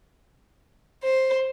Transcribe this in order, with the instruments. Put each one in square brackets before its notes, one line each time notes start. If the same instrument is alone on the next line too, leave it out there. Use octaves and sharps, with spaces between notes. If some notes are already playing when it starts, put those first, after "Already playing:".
[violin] C5